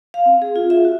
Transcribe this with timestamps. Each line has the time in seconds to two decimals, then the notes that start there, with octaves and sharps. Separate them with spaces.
0.14 F5
0.26 C4
0.42 G#4
0.56 F4
0.70 E5
0.85 F#4